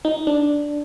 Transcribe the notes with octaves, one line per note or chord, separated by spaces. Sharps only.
D#4
D4